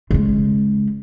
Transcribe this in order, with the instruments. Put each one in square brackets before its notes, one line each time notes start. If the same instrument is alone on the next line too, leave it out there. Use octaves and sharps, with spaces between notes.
[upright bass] C#3 G#3